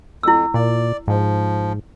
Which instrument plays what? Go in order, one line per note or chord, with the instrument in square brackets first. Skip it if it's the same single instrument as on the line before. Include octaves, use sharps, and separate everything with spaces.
[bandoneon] F2 [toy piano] E4 E6
[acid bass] A#2 [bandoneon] D5
[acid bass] G#2 [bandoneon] F3